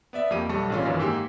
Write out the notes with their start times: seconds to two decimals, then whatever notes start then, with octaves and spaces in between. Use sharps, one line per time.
0.13 B3 D5 E5
0.31 F2 A#3 G4 D6 D#7
0.49 B1 G3 A4 A5 C#6
0.70 A1 A#2 C#3 C#4 D4 F4
0.85 F#2 D#3 E3
0.99 G#2 A#3 G4 G#5 E6